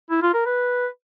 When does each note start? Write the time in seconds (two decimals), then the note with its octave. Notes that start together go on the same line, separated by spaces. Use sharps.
0.10 E4
0.22 F4
0.34 A#4
0.46 B4